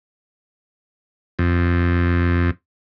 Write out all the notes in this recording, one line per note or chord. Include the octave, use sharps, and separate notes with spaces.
F2